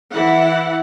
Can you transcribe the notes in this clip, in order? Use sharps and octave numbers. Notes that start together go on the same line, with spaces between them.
E3 E4 F#5